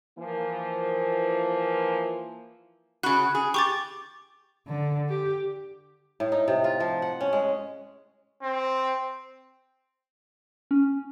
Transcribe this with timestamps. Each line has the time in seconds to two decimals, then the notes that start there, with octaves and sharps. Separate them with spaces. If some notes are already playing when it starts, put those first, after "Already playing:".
0.18 E3 F3 A#3
3.03 C#3 F#4 B5 F#6
3.35 G#4
3.54 G4 C#6 D6 A6
4.67 D3
5.09 G4
6.20 A2
6.32 D#4
6.48 C3
6.64 F4
6.80 F3
7.02 F#5
7.21 C#4
7.33 G#3
8.43 C4
10.71 C#4